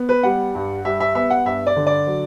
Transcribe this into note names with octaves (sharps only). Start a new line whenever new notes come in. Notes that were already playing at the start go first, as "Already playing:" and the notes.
Already playing: B3
B4
G3 F#5
G2
G3 E5
E5
B3 E5
F#5
G2 E5
D5
D3
D5
F#3